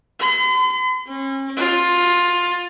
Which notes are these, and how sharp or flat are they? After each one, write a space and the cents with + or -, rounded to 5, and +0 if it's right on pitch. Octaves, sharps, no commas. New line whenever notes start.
C6 -45
C#4 -40
F4 +15